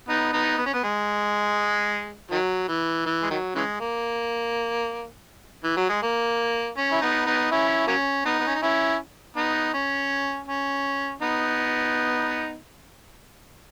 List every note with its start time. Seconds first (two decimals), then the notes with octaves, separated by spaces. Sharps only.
0.09 B3 D#4
0.33 B3 D#4
0.58 B3
0.66 C#4
0.74 B3
0.84 G#3
2.31 D#3 F#3
2.68 E3
3.06 E3
3.23 G#3
3.30 D#3 F#3
3.55 C#3 E3 G#3
3.80 A#3
5.64 E3
5.77 F#3
5.89 G#3
6.02 A#3
6.77 C#4
6.92 E4
7.01 B3 D#4
7.26 B3 D#4
7.51 C#4 E4
7.87 F#3 A#3 C#4
8.25 B3 D#4
8.40 B3
8.47 C#4
8.55 D#4
8.62 C#4 E4
9.36 B3 D#4
9.74 C#4
10.48 C#4
11.22 B3 D#4